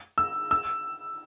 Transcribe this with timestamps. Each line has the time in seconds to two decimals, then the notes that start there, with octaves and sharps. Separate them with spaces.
0.18 E6
0.51 E6